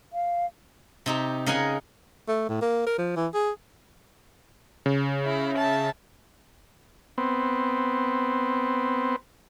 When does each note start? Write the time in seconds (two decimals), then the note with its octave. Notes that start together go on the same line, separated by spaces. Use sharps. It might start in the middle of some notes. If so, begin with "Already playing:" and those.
0.13 F5
1.06 C3 D#4 G4
1.46 C#3 D#4 A#4 D#5 F#5 G#5
2.28 A3
2.49 A2
2.61 A#3
2.86 A#4
2.98 F3
3.16 E3
3.34 G#4
4.86 C#3
5.25 E4
5.57 E5 A5
7.18 B3 C4